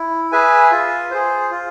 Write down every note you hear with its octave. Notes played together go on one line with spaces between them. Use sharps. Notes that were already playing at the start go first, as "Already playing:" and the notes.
Already playing: E4
G#4 B4 E5 G#5
F4
G#4 C5
F4